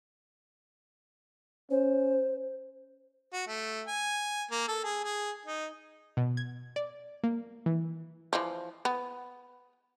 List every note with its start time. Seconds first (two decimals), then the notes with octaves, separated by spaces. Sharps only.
1.71 C#4 C5
3.33 F#4
3.47 A3
3.87 G#5
4.51 A#3
4.68 A4
4.84 G#4
5.04 G#4
5.46 D#4
6.17 B2
6.37 G#6
6.76 D5
7.23 A#3
7.66 E3
8.33 E3 F3
8.85 B3